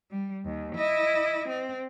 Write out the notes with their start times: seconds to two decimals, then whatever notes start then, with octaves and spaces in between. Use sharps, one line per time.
0.11 G3
0.45 D#2
0.75 E4 D#5
1.49 C4